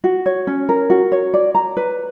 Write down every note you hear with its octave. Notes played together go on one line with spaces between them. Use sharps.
F#4
C#5
C#4
A#4
F#4
C#5
D5
A#5
B4